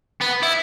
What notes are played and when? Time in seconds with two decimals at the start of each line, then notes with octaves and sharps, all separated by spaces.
0.21 B3
0.43 E4